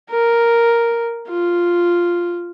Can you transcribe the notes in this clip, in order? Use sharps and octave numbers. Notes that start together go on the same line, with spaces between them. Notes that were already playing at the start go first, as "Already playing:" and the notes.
A#4
F4